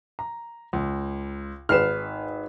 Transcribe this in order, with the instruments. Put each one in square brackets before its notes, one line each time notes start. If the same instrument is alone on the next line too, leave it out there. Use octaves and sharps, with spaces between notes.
[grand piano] A#5
C#2
[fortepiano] G#1 B4 [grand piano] F6 C7 E7